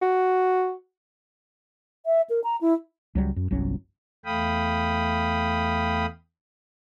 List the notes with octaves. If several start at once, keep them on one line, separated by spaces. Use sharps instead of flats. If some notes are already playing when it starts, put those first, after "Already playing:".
F#4
E5
A#4
A#5
E4
C#2 F#3 G3
F#2
G1 C2 F#3 C#4
E2 A3 F5 G5 B5 D#6